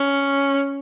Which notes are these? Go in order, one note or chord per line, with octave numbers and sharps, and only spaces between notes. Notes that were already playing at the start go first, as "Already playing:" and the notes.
Already playing: C#4